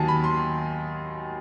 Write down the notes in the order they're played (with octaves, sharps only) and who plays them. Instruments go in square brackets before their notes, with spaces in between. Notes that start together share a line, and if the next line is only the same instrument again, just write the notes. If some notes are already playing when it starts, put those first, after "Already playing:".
Already playing: [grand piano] D#2 D#3 F#3 G#5 A5
B5
C6